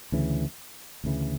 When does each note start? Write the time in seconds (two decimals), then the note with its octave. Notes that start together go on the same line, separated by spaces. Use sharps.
0.12 D2 C#3 E3
1.04 D2 C#3 E3